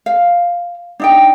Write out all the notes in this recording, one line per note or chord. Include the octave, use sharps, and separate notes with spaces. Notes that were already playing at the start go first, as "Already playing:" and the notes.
F5
D4 D#4 G5